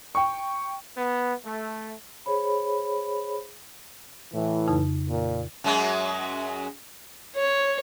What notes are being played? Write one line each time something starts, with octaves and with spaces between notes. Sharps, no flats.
G5 C#6
B3
A3
G#4 C5 C#5 B5
A2 E3
F2 C#3 D#4
A#2
F#2 F#3 G#3
C#5